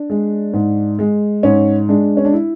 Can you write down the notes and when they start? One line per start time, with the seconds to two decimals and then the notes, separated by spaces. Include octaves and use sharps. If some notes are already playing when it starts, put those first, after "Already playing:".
Already playing: D4
0.10 G#3
0.54 G#2
0.99 G#3
1.43 G#2 C#4
1.89 G#3 D4
2.17 C#4
2.25 D4
2.33 E4